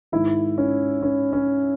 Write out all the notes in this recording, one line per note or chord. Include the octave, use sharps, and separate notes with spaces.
G#2 D#3 E4
C#4
C#4
C#4